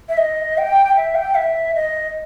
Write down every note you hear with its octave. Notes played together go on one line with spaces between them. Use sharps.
E5
D#5
G5
E5
G5
E5
D#5